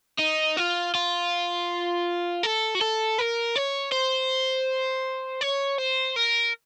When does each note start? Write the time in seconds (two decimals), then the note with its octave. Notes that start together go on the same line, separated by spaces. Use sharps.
0.19 D#4
0.57 F4
0.95 F4
2.43 A4
2.75 F#4
2.81 A4
3.18 A#4
3.56 C#5
3.92 C5
5.41 C#5
5.78 C5
6.16 A#4